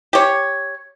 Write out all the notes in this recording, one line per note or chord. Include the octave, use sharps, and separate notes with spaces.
G4 C#5